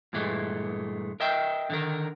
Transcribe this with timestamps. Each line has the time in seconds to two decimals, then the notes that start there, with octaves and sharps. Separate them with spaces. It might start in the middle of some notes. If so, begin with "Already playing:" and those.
0.13 G2 A#2 E3 G#3 A3
1.20 A#4 D#5 E5 G5
1.70 D3 D#3 A#4